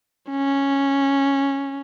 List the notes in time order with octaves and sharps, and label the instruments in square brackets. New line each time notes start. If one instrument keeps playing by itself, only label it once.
[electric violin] C#4